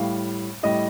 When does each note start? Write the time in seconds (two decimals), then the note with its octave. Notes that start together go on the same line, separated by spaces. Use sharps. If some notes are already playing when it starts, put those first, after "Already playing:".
Already playing: A2 G3 F5
0.63 A2 G3 D#5